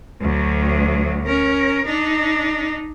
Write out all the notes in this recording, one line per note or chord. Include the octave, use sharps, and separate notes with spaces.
D2 F#3
C#4 A#4
D4 D#4